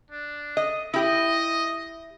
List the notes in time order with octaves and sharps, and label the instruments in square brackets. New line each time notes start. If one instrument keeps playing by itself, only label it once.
[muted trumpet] D4
[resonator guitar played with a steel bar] D#5
[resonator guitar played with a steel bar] E4 G4 [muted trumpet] D#5